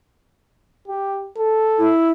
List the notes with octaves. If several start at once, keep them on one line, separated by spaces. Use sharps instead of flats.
G4
A4
E4